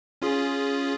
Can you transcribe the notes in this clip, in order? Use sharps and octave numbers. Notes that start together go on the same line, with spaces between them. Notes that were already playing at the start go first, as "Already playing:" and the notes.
C#4 F4 G#4